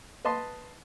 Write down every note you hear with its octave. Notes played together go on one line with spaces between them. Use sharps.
B4 D#5 A5 C6